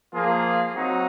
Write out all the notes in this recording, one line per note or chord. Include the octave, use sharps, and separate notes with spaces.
F3 A#3 F4 G#4
F#3 C4 D#4 F#4